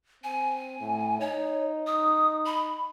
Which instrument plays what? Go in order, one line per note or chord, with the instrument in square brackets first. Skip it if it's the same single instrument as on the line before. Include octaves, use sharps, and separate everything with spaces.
[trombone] C4 [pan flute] G#5
[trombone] A2
[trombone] D#4 [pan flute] C#5
[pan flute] D#6
B5